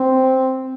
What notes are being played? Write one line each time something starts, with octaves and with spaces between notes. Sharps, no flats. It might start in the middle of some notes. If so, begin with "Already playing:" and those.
Already playing: C4